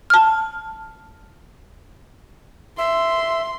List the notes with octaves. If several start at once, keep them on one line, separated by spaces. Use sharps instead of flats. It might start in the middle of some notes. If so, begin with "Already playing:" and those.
A5 F6
E5 C6